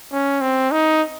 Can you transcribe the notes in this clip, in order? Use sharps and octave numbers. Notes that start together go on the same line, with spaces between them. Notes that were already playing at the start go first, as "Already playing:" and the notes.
C#4
C4
D#4